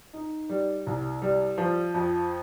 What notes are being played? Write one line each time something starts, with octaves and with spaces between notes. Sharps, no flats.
D#4
G3
C2
G3
F3
F2